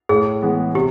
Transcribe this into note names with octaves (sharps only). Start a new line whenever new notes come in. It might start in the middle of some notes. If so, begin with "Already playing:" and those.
A2 G#4
E3 G#3 B3
C3 G4